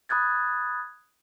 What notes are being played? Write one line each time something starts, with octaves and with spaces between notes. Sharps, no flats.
B5 D#6 F#6 G#6 A6